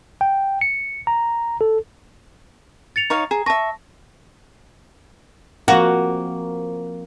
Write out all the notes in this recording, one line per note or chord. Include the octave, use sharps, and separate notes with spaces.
G5
C#7
A#5
A4
A6 C#7 F7
D#4 C#5 F5
G#4 A#5
E5 A5 C#6 A#6
F3 A#3 C4 F#4 A#4